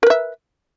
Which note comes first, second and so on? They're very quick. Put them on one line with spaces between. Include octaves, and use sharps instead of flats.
A#4 B4 E5